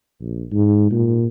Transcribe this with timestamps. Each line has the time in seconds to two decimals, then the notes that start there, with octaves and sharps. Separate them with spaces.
0.21 A#1
0.52 G#2
0.91 A#2